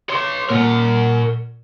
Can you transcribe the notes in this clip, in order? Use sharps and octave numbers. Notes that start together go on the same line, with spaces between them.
C#5 C6
A#2 A#4 F#5